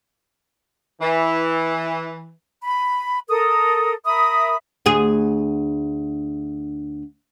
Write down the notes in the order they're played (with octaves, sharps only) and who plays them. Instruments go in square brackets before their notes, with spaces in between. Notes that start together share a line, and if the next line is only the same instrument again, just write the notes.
[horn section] E3
[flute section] B5
A4 A#4 D#6
A#4 E5 B5 D#6
[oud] D2 G#4